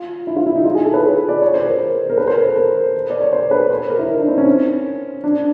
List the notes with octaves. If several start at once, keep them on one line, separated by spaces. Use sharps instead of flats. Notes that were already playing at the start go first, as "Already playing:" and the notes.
Already playing: F4
E4
F4
E4
D#4
F4
G#4
A4
B4
C#5
D5
C#5
C5
A#4
A#4
B4
C5
A#4
A4
A#4
D5
C#5
C5
B4
C5
A#4
E4
D#4
D4
C4
C#4
D4